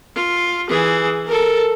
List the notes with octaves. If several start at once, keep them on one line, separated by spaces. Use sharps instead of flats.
F4
E3 G#4
A4 A#4